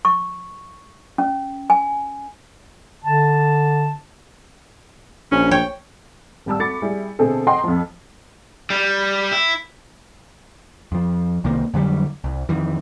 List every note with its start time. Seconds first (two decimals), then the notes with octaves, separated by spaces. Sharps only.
0.05 C#6
1.18 C#4
1.70 G#5
3.04 D3 A5
5.32 A#1 C#4
5.51 C#5 G5
6.46 G#1 G3 A5 E6
6.60 A3 F#4 B5 D6 A6 C#7
6.82 G3 E4 G#4
7.19 B2 D3 A3 C4 G#4 A4
7.47 D#5 F#5 G5 A#5 C6
7.64 F2 F3
8.70 G3
9.32 E4
10.92 F2 F3
11.44 C2 C3 D#3 A#3
11.74 F2 D3 F#3 G3
12.24 C2
12.49 F2 D#3 E3